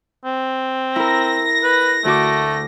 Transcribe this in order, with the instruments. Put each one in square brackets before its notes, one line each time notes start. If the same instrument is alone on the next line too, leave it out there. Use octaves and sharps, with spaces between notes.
[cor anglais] C4
[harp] E4 A#4 [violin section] A#6
[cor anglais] B4
[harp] D2 F#4 D6 [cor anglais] A3